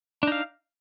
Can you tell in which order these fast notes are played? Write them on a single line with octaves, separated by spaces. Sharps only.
D4 D#4 F5